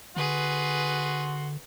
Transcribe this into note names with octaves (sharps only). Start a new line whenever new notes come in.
D3 F#4 G#4 B4 C6